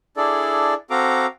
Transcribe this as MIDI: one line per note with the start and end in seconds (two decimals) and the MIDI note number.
0.17 0.74 62
0.17 0.74 64
0.17 0.74 68
0.17 0.74 69
0.17 0.74 74
0.90 1.26 60
0.90 1.26 66
0.90 1.26 69
0.90 1.26 77
0.90 1.26 82
0.90 1.26 86